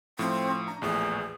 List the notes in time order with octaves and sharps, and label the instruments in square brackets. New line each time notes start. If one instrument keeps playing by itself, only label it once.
[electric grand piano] A2 F3 [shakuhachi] C4
[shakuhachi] D4 [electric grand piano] A#5
[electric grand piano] A#1 E2 A2 [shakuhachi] G#4